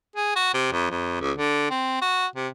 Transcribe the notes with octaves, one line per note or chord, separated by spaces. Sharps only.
G#4
F#4
C3
F2
F2
C#2
D3
C4
F#4
C3